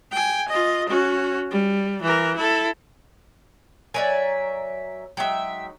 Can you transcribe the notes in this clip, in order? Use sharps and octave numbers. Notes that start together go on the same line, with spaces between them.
G5 G#5
F4 D#5
C#4 F#4
G3
E3 A#4
E4 A4
F#3 A#4 C#5 D5 E5 G#5
F#3 G#3 D#4 E5 G5